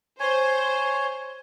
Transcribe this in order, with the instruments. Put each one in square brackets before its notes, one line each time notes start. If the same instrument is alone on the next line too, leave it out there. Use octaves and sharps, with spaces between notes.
[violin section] C5 [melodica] C#5 G#5